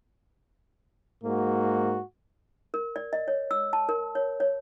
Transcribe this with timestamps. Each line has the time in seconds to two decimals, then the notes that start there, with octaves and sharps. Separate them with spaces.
1.24 G#2 A#3 F#4
2.74 A#4
2.96 D5
3.13 D#5
3.28 C#5
3.51 E6
3.73 A5
3.89 A#4
4.15 C#5
4.40 C#5